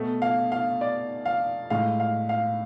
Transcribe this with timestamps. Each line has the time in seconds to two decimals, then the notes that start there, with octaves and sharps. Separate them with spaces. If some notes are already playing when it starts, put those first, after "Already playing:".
Already playing: B2 A3
0.22 F5
0.52 F5
0.81 D5
1.26 F5
1.70 A2 G#3 F5
2.00 F5
2.29 F5